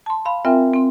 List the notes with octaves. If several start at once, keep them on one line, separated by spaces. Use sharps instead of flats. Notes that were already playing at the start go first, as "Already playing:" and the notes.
A5 C6
F5 B5 C6
C4 F4 A#4 E5 G5 G#5
C4 C6